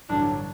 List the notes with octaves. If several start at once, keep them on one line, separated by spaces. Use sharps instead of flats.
A1 G2 D3 F#3 D4